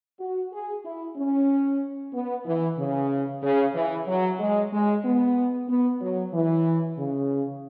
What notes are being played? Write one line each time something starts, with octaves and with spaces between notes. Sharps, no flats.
F#4
G#4
E4
C#4
B3
E3
C#3
C#3
E3
F#3
G#3
G#3
B3
B3
F#3
E3
C#3